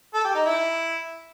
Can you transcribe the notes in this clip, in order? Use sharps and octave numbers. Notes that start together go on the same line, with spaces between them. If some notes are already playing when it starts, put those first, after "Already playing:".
A4
G4
D#4
E4